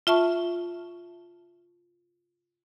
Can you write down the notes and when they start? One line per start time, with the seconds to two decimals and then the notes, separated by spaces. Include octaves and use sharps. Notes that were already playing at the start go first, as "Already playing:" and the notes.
0.07 F4 E5 A5 C#6